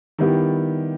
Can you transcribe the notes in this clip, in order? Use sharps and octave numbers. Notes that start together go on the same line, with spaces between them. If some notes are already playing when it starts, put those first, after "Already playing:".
D#3 G3 B3 E4 G4